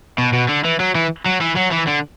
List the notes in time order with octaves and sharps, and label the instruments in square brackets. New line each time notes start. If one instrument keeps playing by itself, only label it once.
[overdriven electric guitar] B2
B2
D3
E3
F#3
E3
F#3
E3
F#3
E3
D3